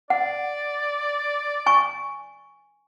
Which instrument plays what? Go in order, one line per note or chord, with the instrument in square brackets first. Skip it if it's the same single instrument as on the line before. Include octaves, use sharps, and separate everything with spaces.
[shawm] D5 [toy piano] F#5
[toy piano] G#5 C#6